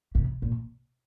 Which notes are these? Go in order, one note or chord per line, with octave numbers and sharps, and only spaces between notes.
C3
A#2